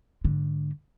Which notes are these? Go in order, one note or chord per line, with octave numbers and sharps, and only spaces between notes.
G#2 D3